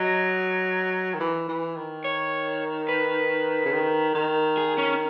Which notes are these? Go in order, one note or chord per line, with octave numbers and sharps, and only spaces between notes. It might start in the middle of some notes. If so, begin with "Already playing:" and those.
Already playing: F#3 D#5
D#3
E3
E3
D#3
C#5
B4
C#3
D#3
D#3
G#4
C#4